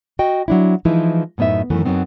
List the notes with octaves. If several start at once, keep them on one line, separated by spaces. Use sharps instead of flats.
F#4 D#5 G5
F#3 D4 E4
E3 F3 G#3 D#4 E4 B4
F#2 A2 B3 D#4 E5
F#2 D#3 E3 A3
F#2 A#2 F#3 B3 C4 D#4